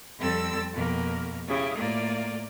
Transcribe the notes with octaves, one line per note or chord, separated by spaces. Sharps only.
F2 G3 C4 A4 E6 A6
F2 B2 A#3
C#3 E4 G4
A2 A#3 F4 D5